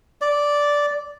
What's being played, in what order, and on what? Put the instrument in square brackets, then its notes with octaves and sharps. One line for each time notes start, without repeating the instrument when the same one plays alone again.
[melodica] D5